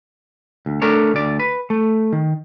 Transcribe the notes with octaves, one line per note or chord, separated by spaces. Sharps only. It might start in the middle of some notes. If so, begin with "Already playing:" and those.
D2
A3 D4 A4 A#4 C#5
D2 D5
B4
A3
D#3